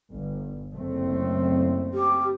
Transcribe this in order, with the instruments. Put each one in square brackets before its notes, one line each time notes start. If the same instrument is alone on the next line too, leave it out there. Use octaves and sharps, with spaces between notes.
[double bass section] G1
F#1 A3 C4
[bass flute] G4